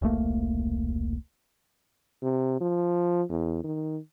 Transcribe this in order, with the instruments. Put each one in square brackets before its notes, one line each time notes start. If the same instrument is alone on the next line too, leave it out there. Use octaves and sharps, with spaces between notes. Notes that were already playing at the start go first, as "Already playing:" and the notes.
[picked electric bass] E1 C2 A3 A#3
[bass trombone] C3
F3
E2
D#3